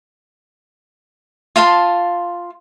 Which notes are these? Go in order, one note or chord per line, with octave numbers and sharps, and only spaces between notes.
F4 F5 A5 C6